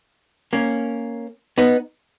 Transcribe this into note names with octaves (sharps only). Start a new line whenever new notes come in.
A#3 C#4
B3 D#4